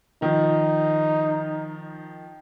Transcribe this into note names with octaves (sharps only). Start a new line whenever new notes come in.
D#3 F3 D#4